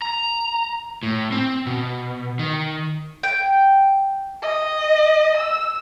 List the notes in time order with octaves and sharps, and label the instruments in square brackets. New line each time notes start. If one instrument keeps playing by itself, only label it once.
[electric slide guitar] A#5
A2
C4
B2
D#3
[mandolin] G5
[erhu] D#5
E6